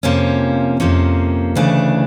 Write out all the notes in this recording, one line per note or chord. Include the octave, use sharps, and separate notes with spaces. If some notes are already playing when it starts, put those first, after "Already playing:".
F2 C3 F3 A#3 C#4
F2 C3 F3 A#3 C#4
D2 C#3 E3 A3 D4